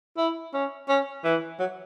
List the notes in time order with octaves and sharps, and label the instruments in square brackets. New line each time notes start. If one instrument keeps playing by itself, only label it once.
[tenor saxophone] E4
C#4
C#4
E3
F#3